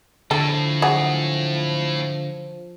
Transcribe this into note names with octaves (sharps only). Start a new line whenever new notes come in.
A2 D3 F3 A4
F#3 G#4